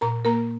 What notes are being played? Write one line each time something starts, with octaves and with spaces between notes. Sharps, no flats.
A#2 A#4 A#5
A#3 A#4 A#5